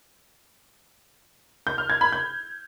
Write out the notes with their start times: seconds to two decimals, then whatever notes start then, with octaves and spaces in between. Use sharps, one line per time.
1.67 G6
1.78 F6
1.90 G#6
2.01 B5
2.12 G6